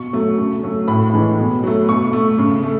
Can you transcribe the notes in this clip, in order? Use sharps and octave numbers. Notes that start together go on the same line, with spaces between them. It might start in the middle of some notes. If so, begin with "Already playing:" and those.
Already playing: B2 C#6
F#3 A3
C#3
F#3 A3
A2 B5
E3 G#3
B2
F#3 A3
B2 C#6
A3
C#3
A3